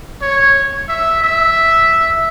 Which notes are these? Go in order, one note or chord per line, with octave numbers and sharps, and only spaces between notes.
C#5
E5
E5